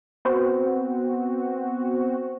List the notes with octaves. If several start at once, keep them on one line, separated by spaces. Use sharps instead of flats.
B3 C4 F#4 C5